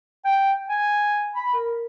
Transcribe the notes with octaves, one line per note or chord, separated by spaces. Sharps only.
G5
G#5
B5
A#4